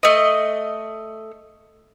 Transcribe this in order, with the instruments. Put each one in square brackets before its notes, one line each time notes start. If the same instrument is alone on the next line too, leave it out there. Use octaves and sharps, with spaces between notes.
[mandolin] A3 D#5